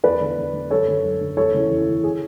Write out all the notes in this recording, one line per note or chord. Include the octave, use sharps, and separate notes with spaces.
E2 B4 D5
D3
E2
D3
F#2 A4 C#5
D3
F#2
D3
E2 A4 C#5
C#3 E3
E2
C#3 E3
G#4